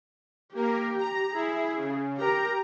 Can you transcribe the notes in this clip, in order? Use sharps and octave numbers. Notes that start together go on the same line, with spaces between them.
A#3 G4 A#4
A#5
E4 G#4
C#3
G4 A#4 A#5